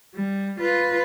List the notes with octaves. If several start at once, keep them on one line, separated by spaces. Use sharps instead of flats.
G3
F4 B4